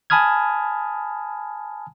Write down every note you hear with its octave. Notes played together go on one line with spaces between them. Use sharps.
G#5 A5 B5 D#6 F6 G#6